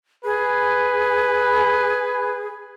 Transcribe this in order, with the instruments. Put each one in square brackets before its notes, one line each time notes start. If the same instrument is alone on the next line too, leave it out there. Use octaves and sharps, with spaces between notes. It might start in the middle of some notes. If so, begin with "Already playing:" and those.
[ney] G#4 [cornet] B4